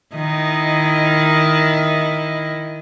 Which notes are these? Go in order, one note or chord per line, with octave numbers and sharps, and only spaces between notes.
D#3 E4 D#5